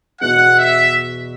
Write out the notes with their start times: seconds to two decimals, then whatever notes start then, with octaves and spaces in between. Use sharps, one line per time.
0.21 E2 B2 B3 F#4 F#5
0.57 E5